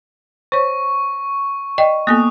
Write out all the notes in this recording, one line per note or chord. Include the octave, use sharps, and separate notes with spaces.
C5 C#5 C#6
D5 D#5 G5
A#3 B3 A4 D#6 F#6